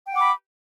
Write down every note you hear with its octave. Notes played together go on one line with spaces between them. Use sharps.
F#5 G5 B5 D6